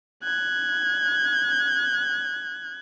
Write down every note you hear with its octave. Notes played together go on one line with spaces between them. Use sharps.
F#6 G#6